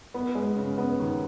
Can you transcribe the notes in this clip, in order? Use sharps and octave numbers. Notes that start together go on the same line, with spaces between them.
B3
G#3
C#3
B3
D#2